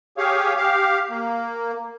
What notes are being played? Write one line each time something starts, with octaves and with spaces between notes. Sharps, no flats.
G4 G#4 C#5 F5
G4 F5
A#3